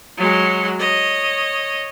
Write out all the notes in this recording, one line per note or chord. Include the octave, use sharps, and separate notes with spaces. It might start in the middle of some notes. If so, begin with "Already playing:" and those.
F#3 G#3
C#5 D#5